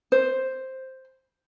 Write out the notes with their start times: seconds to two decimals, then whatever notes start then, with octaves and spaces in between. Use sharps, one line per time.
0.12 C5